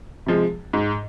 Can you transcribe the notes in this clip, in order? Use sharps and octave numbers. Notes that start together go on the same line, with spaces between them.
C3 F3 G#3
G#2